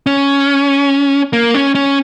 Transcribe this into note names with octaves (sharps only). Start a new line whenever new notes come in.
C#4
A#3
C#4
C#4